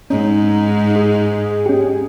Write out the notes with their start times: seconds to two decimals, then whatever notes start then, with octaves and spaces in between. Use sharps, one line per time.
0.10 G#2 C#4 D#4
0.96 G#4
1.66 C#4 G4